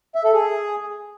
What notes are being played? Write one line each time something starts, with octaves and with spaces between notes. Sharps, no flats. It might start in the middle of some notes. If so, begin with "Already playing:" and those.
E5
A4
G#4